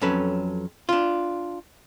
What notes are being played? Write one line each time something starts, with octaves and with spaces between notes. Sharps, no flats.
F2 F#3 C#4 A4 B4
D4 F4